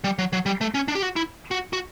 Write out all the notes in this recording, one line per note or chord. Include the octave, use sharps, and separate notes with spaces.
G3
F#3
F#3
G3
A3
C#4
D4
G4
F#4
E4
F#4
F#4